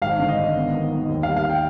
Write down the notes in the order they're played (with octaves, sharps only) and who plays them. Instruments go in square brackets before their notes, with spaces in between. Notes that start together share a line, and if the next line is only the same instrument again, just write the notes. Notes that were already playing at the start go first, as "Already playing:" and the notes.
[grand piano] G#1 F5
D3
D#5
G#1
B3
D#3
D#3
D#2
G3 F5
F5
G5